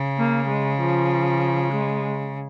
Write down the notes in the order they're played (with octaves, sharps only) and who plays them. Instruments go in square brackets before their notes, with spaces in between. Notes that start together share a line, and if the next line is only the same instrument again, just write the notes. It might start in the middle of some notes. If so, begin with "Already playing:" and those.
Already playing: [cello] C#3
[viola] A#3
G#3
F3
G#3